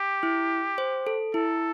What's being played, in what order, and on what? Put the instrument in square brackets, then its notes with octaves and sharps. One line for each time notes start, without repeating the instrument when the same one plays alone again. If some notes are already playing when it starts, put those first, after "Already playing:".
Already playing: [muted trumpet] G4
[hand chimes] E4
C5
A4
[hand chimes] E4 [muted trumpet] A4